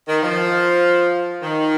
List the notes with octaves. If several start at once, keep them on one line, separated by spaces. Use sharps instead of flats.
D#3
F3
D#3